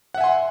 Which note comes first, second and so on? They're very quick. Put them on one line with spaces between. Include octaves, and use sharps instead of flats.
F#5 E5 G#5 C6